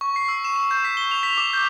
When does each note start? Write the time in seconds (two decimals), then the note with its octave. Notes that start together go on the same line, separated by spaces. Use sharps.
0.01 C#6
0.16 C7
0.28 E6
0.45 E7
0.56 E7
0.71 G6
0.84 B6
0.97 G7
1.11 F7
1.23 B6
1.37 D6
1.53 G6